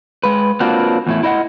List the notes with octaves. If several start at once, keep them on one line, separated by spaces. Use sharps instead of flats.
G#3 B4
A#3 C4 D4 F4 F#4 B4
E2 A2 E4
E4 D#5 E5 F#5